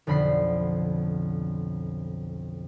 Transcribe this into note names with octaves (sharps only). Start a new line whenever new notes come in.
B1 F2 D3 B5 A#6 C7